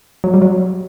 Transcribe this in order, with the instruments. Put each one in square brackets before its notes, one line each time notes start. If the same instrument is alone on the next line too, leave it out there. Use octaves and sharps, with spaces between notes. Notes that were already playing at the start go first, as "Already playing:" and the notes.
[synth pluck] F#3
G3
F#3